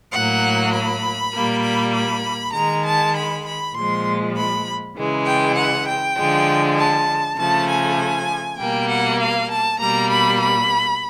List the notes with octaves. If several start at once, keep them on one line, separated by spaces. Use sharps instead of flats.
A2 F#3 A#3 F#5
B5
A#2 G3 A#3
B5
B5
D#3 G#3 A#5
A5
B5
B5
A#2 F3 G#3 C6
B5
C#3 E3 G#3
G5
F#5
G5
D3 F3 G#3
A5
C#3 F3 A3 A5
G#5
B2 G3 A#3 G5
F#5
F5
A5
B2 G3 A#3 A#5
B5
B5